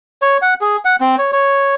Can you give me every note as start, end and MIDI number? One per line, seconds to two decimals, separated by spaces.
0.22 0.37 73
0.42 0.54 78
0.61 0.76 68
0.85 0.96 78
1.00 1.16 60
1.18 1.31 73
1.32 1.75 73